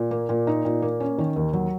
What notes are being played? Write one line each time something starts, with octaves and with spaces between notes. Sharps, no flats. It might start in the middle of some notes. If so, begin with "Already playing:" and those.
Already playing: A#2
A#3
A#2
D#4
A#2
A#3
C#4
D#3
D#2
F#3